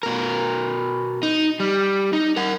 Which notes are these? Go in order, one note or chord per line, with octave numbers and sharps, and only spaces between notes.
B2 A#4
D#4
G3
D#4
A#4 F#5